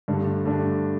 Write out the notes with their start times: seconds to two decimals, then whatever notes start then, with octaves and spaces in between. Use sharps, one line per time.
0.08 G2 D3 A3 D4
0.45 G2 D3 A3 D4